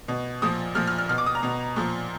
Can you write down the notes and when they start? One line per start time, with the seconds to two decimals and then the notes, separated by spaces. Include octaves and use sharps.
0.08 B2
0.42 A#2 F3 D#6
0.75 A#2 F3 F6
0.87 F6
0.98 F6
1.09 B2 F6
1.18 D6
1.26 D#6
1.35 A#5
1.43 B2
1.76 A#2 F3